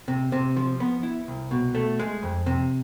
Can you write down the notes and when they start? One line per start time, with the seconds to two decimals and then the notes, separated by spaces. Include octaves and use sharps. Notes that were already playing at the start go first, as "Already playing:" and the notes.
0.08 C3
0.32 C3
0.56 F3
0.80 B3
1.03 E4
1.28 C2
1.51 B2
1.75 A3
1.99 G#3
2.23 F2
2.46 C3